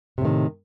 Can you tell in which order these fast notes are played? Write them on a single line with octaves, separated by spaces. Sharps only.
C3 A2 D#3